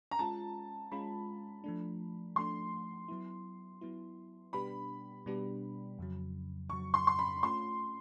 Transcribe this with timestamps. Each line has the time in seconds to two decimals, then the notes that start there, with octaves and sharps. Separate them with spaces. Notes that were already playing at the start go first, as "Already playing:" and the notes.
0.11 A#5
0.19 G#3 C#4 F4 A5
0.92 G#3 C#4 F4 B5
1.64 F3 A3 D4
2.36 F3 A3 D4 C6
3.08 F#3 B3 E4
3.81 F#3 B3 E4
4.53 B2 G3 B3 D4 G4 B5
5.26 B2 G3 B3 D4 G4
5.98 F2 C#3 F#3
6.70 F2 C#3 F#3 C#6
6.94 C6
7.07 C6
7.19 B5
7.43 A3 C#4 F4 C6